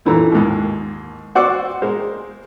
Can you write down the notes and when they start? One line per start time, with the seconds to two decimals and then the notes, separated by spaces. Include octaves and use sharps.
0.05 F#2 A#2 E3 A4 A#5 E6
0.32 D#2 G#2
1.35 F#4 C5 D5 F#5 D6 E6
1.82 G#3 A#3 A#4 C5